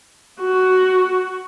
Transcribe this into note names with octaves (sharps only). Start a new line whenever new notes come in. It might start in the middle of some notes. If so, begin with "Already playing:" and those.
F#4